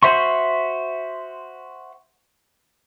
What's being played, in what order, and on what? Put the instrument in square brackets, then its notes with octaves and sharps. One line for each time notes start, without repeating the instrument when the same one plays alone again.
[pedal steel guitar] F#4 C5 E5 C6 C#6